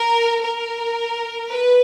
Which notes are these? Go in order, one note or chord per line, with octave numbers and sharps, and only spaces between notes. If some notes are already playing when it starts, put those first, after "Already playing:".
Already playing: A#4
A#4
B4